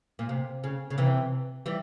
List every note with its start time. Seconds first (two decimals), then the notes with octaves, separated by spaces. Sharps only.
0.19 A#2
0.29 C3
0.64 C#3
0.90 C#3
0.98 C3 E3
1.66 E3 G3